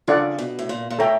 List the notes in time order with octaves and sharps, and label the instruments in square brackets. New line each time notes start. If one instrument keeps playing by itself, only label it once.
[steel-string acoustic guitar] C#3 [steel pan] D4 F4 A4 D5 F#5
[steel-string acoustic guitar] B2
A2
A#2
A#2
[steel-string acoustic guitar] A2 [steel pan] A4 C#5 E5 G5 A#5